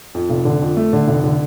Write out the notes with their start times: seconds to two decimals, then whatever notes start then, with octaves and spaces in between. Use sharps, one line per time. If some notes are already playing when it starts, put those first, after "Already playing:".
0.15 F2
0.30 F1
0.45 D3
0.61 F2
0.77 A3
0.93 D3
1.08 F1
1.24 D3